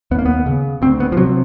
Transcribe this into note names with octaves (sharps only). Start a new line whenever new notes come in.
D#2 B3
A#3
B3
C#3
D2 C4
B3
F3
C3 F#3